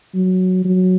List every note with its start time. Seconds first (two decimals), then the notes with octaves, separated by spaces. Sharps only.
0.14 F#3
0.65 F#3